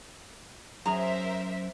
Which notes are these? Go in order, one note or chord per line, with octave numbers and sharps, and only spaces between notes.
F#2 G#4 A#4 C5 E5 A#5